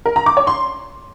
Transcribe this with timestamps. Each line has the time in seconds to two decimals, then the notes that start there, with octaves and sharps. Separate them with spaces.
0.06 A#4
0.16 A#5
0.26 D6
0.37 C#5
0.47 C6